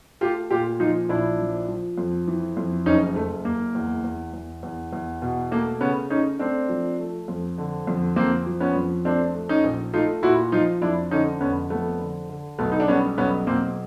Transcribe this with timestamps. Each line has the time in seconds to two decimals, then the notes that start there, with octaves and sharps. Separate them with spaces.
0.21 A3 F4 G4
0.50 A#2 F4 G4
0.80 F3 D#4 F4
1.09 A#1 D4 E4
1.39 F3
1.69 F3
1.98 F2
2.27 E3
2.57 F2
2.86 F#1 C#4 D#4
3.16 F#1 A3
3.45 F#1 A#3
3.75 E2
4.04 E2
4.33 E2
4.63 E2
4.93 E2
5.22 B2
5.51 A3 A#3
5.81 C#3 B3 C#4
6.10 A3 C#4 D#4
6.39 A3 C4 D4
6.69 F3
6.99 A3
7.28 F2
7.58 D3
7.87 F2
8.16 F2 A#3 C4
8.46 F3
8.60 B3 C#4
8.76 F2
9.05 A3 C4 D4
9.35 A3
9.49 C#4 D#4
9.64 A#1
9.93 A3 D#4 F4
10.23 A#2 E4 F#4
10.52 F3 D#4 F4
10.82 F2 D4 E4
11.11 D3 C#4 D#4
11.41 F1 B3 C#4
11.70 F2 A3 B3
12.00 D3
12.29 D3
12.58 B1 A3 B3
12.72 D#4
12.80 D4
12.88 G3 B3 C#4
13.18 B1 B3 C#4
13.47 B1 A#3 C4